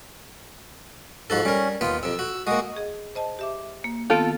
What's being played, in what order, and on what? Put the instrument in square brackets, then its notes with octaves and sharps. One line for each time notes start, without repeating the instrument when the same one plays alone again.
[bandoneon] G#2 [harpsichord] F3 F#4 A4
[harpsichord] G3 A#4 [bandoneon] C#4
[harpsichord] D#2 B3 G5 [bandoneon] F4
[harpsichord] F2 C3 [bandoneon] E6
[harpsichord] F#4
[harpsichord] G#3 A#3 [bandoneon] F#4 D#6
[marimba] G#4 D#5
C5 D#5 A5
G4 E5 D6
A#3
[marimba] D#3 B3 C4 [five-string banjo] F4 A4